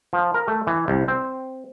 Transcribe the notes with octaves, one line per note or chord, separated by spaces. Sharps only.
F3
A#4
A3
E3
C2
C4